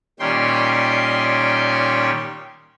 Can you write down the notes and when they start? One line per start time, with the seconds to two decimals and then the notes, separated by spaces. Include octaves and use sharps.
0.20 A#2 D#3 G3 C#4 G5 C6